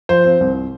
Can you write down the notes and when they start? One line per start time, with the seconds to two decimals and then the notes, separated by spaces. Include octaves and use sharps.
0.09 F3 C5
0.24 C4
0.40 C2